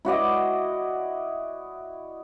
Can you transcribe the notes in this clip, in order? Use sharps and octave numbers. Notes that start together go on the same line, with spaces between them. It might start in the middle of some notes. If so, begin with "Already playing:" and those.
E4 F#4 D5 D#5